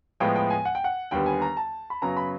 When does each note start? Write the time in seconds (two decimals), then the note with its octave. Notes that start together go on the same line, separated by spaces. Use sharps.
0.20 A2 F3 G#3 B3 G5
0.36 G5
0.50 G#5
0.65 F#5
0.75 G5
0.84 F#5
1.11 D#2 D3 G3 B3 G5
1.26 G#5
1.42 A#5
1.57 A5
1.90 B5
2.02 F#2 C#3 F#3 B3 A#5
2.17 B5